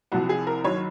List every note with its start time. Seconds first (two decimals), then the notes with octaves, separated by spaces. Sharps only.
0.12 C2 C3 F3 F#4
0.29 G#4
0.47 A#4
0.64 F#1 F#2 D#3 F#3 C#5